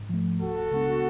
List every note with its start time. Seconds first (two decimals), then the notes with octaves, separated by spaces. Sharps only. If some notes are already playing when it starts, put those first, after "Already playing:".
Already playing: G#2
0.09 F3 A3
0.40 C#2 F#4 A4
0.71 C#3 G#3 B3 D4